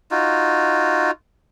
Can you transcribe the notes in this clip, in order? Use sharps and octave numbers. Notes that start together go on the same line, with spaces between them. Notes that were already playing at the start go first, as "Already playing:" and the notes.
D#4 F4 F#4